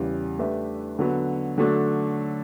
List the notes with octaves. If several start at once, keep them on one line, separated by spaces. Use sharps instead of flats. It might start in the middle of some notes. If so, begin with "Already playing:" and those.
Already playing: E2 C#3 G3
A3 D4 G4 B4 E5
D3 F#3 B3
D3 F#3 A3 D4